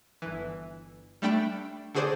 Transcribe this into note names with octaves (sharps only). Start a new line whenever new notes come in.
G1 E3
G3 A3 D4 G5 B5 D7
D3 F#4 G#4 C5 D5